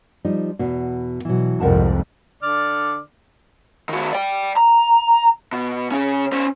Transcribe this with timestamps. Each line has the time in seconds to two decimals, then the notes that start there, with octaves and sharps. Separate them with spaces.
0.25 F3 G3 D#4
0.59 E2 B2
1.25 B2 E3 F#3
1.60 C2 F2 G#2 A#4 F#5 A5
2.43 D3 D5 F6
3.89 D#3 F#4
4.13 D5 G5
4.56 A#5
5.53 B2
5.92 C#3 C#4
6.32 C#4 C5